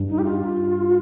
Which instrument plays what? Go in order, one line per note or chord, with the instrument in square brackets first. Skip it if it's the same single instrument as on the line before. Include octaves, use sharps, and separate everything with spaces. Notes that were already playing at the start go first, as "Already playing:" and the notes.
Already playing: [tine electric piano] G2
[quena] D#4
G4
F4